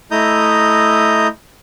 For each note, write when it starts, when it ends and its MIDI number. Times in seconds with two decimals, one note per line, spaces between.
0.11 1.27 57
0.11 1.27 64
0.11 1.27 75
0.11 1.27 82
0.11 1.27 87
0.11 1.27 91